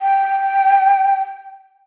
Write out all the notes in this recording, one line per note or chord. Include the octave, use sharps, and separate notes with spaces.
G5